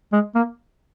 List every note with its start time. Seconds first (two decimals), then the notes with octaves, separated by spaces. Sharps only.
0.13 G#3
0.35 A#3